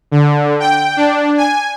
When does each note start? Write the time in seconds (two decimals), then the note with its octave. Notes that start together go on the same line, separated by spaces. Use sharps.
0.12 D3
0.60 G5
0.97 D4
1.37 G#5